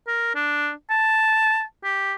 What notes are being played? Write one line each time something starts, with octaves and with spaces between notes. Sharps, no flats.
A#4
D4
A5
G4